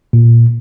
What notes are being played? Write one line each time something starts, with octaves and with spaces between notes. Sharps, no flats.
A#2